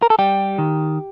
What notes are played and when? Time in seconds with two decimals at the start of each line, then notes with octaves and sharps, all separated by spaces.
0.02 A#4
0.10 A4
0.19 G3 G4
0.58 D#3